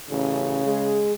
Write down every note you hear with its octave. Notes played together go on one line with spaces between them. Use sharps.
A1 C#3
G#3 G#4